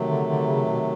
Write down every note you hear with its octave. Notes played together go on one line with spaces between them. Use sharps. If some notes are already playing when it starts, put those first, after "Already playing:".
Already playing: C3 D#3 F#3 A3
D3
D3
C#3
B2